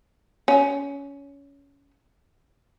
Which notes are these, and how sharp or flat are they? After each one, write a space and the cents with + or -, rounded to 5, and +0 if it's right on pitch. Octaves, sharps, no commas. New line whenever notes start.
C#4 +20